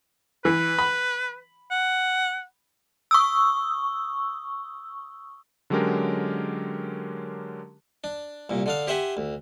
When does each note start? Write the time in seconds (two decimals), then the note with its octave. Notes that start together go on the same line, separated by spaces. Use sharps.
0.45 E3 B4
0.79 B5
1.71 F#5
3.11 C#6 D#6 E6
5.70 D3 F#3 G#3 C#4 G4 A#4
8.04 D4
8.50 C2 A#2
8.66 D3 D4 F5
8.87 G4 C5 E5 F#5 G#5
9.17 D2